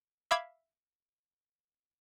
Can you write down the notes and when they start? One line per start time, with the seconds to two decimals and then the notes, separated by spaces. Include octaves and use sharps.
0.31 E5 F5 B5 D6 G#6